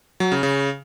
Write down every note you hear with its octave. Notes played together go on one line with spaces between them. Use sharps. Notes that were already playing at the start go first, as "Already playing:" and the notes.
F#3
C#3
C#3